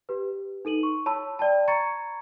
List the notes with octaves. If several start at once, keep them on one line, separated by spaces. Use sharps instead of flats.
G4 B4
D#4 A4 D#7 F#7
C6 C#6
C#5 A5 B5 E6
D5 G5 A5
A#5 B5 C#6 G#6 A6 C#7